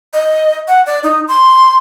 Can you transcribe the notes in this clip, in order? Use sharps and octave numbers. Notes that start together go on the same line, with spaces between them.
D#5
F#5
D5
D#4
C6